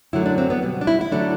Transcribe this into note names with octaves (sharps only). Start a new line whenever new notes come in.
F#2 D3 F#3 A3 E4
D4
C4
B3
B2 G3
D4
E4
E4
D3 F#3 A3 D4